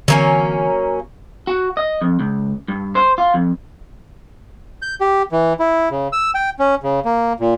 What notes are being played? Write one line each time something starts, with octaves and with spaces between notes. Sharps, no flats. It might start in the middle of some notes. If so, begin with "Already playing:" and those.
D3 E3 F#3 A#3 C4 C#4
F#4
D#5
F2
C#2
G2
C5
F4
F2
G6
G4
E3
E4
C#3
E6
G5
C#4
C#3
A#3
A#2